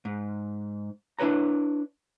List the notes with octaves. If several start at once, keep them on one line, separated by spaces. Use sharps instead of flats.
G#2
D4 E4 B4 C#5 A#5